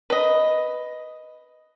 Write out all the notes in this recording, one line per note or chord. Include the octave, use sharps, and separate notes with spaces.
B4 D#5